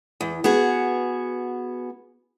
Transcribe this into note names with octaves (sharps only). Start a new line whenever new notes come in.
E2
B3 F#4 G#4